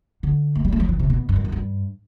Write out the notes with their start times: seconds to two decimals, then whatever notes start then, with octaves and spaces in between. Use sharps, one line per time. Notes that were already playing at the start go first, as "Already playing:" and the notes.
0.23 D3
0.55 A3
0.65 G3
0.72 A3
0.80 F#3
0.89 E3
0.99 C3
1.10 B2
1.29 G2
1.36 F#2
1.45 E2
1.52 G2